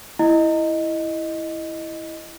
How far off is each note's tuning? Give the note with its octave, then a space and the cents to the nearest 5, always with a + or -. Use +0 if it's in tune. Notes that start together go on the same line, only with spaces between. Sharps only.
E4 +0 D#5 +0